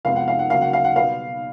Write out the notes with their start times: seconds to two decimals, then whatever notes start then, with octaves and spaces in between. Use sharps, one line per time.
0.05 F2 C3 F3 G#3 B3 F5
0.16 F#5
0.28 F5
0.39 F#5
0.50 C#3 F#3 A#3 F5
0.62 F#5
0.73 F5
0.84 F#5
0.96 B2 G3 B3 F5